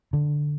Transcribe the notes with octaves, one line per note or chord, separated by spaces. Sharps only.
D3